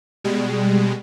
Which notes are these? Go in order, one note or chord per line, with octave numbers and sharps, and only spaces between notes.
B2 G3 G#3